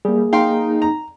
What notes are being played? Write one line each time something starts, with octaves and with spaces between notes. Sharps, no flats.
G3 A#3 G#4
D#4 F5 G5 C6
A#5